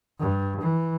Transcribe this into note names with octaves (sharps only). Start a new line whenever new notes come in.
G2
E3